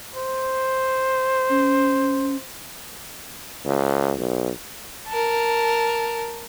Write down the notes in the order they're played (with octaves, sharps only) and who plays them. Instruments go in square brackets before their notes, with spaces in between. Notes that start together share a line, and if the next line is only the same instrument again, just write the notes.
[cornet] C5
[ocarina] C#4
[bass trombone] C#2
B1
[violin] A#4 A5